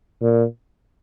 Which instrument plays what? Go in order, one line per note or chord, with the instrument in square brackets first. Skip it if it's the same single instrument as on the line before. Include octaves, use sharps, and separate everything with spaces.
[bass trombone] A#2